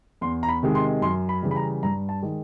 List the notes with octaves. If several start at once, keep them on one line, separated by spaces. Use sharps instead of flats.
E2 C6
A#5
B5
C3 D#3 G#3
C6
F#2 C6
B5
C#3 E3 G3
B5
A#5
G2 A#5
A5
D#3 G#3